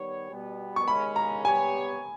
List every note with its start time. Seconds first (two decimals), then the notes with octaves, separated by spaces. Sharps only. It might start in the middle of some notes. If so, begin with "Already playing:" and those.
Already playing: D#3 G3 B3 G4 C#5
0.30 B2 G3 B3
0.76 C#6
0.87 D#2 C#3 G#3 C#4 B5
1.16 A#5
1.45 G3 B3 G4 C#5 G#5